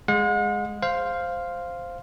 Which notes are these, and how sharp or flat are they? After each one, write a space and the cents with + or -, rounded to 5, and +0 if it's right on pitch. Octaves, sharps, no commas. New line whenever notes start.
G#3 +0 F#5 -45
C5 +0 F5 +0